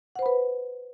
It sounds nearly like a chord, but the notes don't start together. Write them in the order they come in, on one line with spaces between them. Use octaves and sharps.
F#5 C5 B5 B4